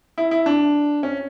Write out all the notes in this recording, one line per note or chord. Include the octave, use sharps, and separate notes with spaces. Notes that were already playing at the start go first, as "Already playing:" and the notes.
E4
E4
D4
C#4